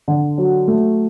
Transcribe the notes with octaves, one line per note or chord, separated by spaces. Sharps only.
D3
F#3
A3